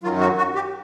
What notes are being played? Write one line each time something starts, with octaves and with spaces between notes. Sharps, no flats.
F#2 D#3 F#3 F4
F#4
F#4
G4